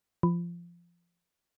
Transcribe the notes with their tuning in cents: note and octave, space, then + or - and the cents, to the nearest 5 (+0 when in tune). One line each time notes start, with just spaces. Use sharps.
F3 -20